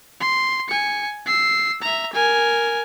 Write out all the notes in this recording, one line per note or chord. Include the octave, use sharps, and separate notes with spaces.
C6
G#5 C#7
E6 C7
E5 A#5
A#4 G#5